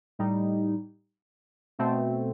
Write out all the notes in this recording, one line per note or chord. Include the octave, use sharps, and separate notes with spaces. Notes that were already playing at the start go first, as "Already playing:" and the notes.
A2 G3 D#4
B2 A3 C4